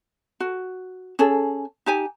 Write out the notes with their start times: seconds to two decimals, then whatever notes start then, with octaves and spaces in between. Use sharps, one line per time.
0.40 F#4
1.19 C#4 G#4 A4
1.86 D#4 G4 G#5